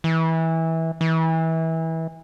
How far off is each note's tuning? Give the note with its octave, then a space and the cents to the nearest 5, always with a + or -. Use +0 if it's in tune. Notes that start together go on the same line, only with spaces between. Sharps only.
E3 -20
E3 -25